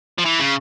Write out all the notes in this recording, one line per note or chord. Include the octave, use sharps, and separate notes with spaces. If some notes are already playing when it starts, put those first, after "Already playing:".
F3
E3
C#3